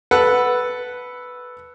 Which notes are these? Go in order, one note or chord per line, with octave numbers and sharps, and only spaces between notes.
A4 B4 F#5